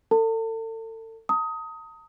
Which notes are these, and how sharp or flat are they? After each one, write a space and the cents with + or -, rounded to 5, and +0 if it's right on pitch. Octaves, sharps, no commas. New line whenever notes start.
A4 +35 A5 +40
A#5 -45 D#6 +20